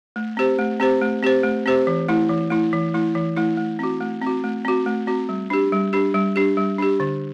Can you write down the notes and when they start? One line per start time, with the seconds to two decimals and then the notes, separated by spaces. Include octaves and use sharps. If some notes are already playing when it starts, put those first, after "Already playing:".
0.16 A3
0.37 C4 G4 C5
0.59 A3
0.80 C4 G4 C5
1.01 A3
1.23 C4 G4 C5
1.44 A3
1.66 C4 G4 C5
1.87 E3
2.08 A3 E4
2.30 E3
2.50 A3 E4
2.73 E3
2.94 A3 E4
3.15 E3
3.36 A3 E4
3.57 A3
3.79 C4 F#4
4.01 A3
4.22 C4 F#4
4.44 A3
4.65 C4 F#4
4.86 A3
5.07 C4 F#4
5.29 G3
5.50 D4 G4
5.72 G3
5.93 D4 G4
6.14 G3
6.36 D4 G4
6.57 G3
6.79 D4 G4
7.00 D3